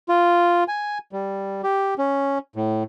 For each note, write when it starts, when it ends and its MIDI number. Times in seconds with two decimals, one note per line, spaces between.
0.09 0.64 65
0.68 0.98 80
1.13 1.61 55
1.63 1.94 67
1.98 2.38 61
2.56 2.83 45